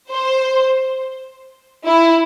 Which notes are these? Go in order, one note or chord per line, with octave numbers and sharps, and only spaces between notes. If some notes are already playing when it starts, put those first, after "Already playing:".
C5
E4